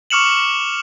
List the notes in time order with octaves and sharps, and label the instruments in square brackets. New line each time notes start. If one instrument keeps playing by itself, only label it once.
[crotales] C#6 D6 F6 C#7 E7 F#7